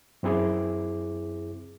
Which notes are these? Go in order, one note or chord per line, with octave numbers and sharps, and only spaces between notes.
F#2 C4 E4 G#4 D6